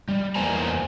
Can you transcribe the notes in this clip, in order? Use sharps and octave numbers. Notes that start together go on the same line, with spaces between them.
G3
E2 A#3 C5 G#5 A#5